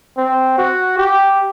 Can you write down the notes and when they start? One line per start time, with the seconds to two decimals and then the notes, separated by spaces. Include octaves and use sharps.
0.17 C4
0.58 F#4
0.98 G4